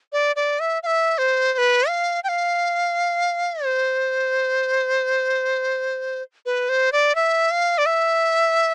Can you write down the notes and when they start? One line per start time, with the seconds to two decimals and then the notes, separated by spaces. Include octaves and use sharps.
0.13 D5
0.36 D5
0.60 E5
0.83 F5
0.86 E5
1.18 C5
1.54 C5
1.58 B4
1.88 F5
2.24 G5
2.29 F5
3.64 C5
6.46 B4
6.69 C5
6.92 D5
7.15 E5
7.51 F5
7.78 D5
7.86 E5